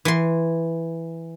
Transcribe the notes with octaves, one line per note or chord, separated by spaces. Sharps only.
E3 C6